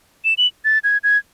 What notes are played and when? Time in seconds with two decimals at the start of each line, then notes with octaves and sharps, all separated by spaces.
0.25 E7
0.38 F#7
0.65 A6
0.84 G#6
1.04 G#6